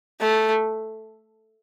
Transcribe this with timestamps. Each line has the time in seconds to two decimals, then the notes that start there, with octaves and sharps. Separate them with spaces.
0.20 A3